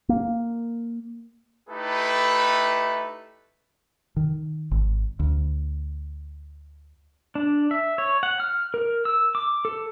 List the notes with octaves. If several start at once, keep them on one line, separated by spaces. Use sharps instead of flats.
A#3
A3 D#4 E4 G4 A4 B4
D#3
G#1
D2
D4
E5
C#5
F#5
F6
A#4
E6
D6
A4